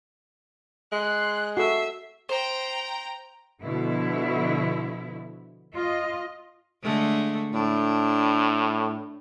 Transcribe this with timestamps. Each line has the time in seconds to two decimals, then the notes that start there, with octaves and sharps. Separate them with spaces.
0.92 G#3 C6 F#6
1.57 F#4 A4 E5 C7
2.29 C5 G5 A#5
3.62 B2 D3 F3 E4
5.74 F4 D#5
6.83 D3 G#3 A3
7.53 A2 D4